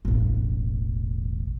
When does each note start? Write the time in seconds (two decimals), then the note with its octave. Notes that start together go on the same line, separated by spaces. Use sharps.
0.05 E1 A1